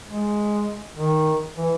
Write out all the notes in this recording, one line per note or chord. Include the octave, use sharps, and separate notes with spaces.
G#3
D#3
E3